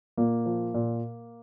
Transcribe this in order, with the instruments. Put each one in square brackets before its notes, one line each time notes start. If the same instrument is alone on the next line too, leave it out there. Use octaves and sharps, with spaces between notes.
[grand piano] A#2 A#3
F3
A#2